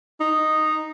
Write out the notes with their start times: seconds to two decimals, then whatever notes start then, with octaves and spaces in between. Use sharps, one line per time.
0.20 D#4